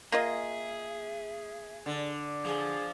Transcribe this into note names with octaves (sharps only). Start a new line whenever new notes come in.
A#3 F4 G#4 D#5 E5
D3
F3 G#4